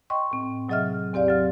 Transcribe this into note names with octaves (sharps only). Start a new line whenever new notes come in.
D#5 G5 C6 C#6
A2 C4
C3 F#3 G#4 D#5 E5 F6
E2 C4 G4 D5 F5
F#3 F6